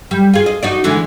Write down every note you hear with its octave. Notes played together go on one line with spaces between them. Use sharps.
G3
F4 G#4
D#5
D#4 F#4 D5
D3 E3 G#3